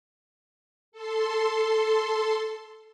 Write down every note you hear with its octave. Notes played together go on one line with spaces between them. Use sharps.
A4 C6